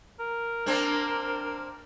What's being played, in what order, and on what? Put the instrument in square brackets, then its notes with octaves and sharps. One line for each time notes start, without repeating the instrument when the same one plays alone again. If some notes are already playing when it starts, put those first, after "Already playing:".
[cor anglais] A#4
[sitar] A#3 C4 D4